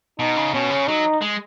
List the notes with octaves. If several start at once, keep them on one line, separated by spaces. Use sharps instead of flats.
B2 D#4
C#3
B2 C#4
C#3
F#3 D#4
G#3